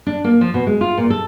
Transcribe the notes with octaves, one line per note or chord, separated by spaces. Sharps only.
D4
A#3
F3
B2
G#3
F4
A#2
A4